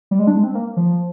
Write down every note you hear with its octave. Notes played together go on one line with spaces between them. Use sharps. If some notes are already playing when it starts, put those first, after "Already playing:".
G3
G#3
D4
G#3
C4
A#3
F3